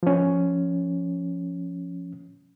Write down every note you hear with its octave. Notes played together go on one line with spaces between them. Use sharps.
F3 C#4